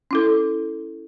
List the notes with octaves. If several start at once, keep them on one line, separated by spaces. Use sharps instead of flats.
C#4 E4 A4